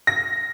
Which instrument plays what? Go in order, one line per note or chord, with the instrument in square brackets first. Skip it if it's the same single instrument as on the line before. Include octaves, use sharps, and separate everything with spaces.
[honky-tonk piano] A#6